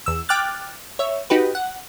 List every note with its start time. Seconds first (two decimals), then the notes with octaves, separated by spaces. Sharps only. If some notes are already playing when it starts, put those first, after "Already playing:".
0.06 E2 E6
0.29 G5 D6 F6 F#6 A6
0.99 C#5 E5
1.30 D#4 F#4 G4 B4
1.55 F#5